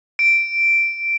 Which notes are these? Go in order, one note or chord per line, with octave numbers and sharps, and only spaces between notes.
D7